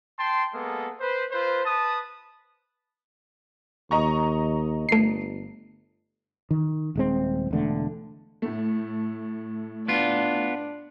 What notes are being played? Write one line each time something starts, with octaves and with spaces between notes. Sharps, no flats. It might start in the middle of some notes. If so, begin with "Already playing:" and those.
G5 A5 C6
G#3 A#3 B3 A4
B4 C5
F4 B4 C5
B4 A5 D#6
D#2 D#5 A#5 C#6
G1 A3 C7
D#3
D#1 G#3 C4
E1 D3 A3
A2 A3
B3 D4 F4